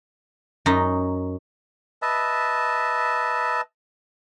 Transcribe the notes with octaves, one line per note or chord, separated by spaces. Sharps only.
F#2 D#4
B4 D#5 E5 A5